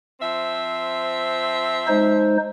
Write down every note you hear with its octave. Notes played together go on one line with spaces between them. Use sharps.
F3 C4 E5
G#3 D#4 C5